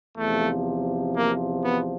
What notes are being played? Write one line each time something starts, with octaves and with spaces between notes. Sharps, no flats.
E2 C3 F3 A3
A#3
B3